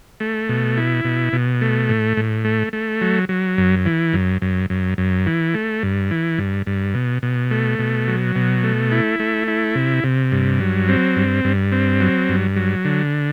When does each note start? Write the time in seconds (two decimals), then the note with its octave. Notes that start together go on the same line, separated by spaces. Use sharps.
0.20 A3
0.49 B2
0.77 E4
1.05 B2
1.33 B2
1.61 A3
1.89 A2
2.17 A2
2.45 A3
2.73 A3
3.01 F#3
3.29 F#3
3.58 F#2
3.86 E3
4.13 F#2
4.42 F#2
4.70 F#2
4.98 F#2
5.27 E3
5.54 A3
5.83 G2
6.11 E3
6.38 G2
6.67 G2
6.94 B2
7.23 B2
7.51 A3
7.79 B2
8.08 F#3
8.36 B2
8.63 A3
8.92 E4
9.20 A3
9.48 E4
9.75 C3
10.04 C3
10.32 G2
10.60 F#3
10.88 C4
11.16 G2
11.45 G2
11.72 C4
12.01 F#3
12.29 G2
12.56 F#3
12.85 D3